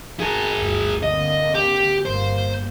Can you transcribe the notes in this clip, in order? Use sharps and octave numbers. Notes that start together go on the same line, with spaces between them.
G#4 A#4
G1 D2
D3 A#3 C4 D#5
G4
G1 A#3 C5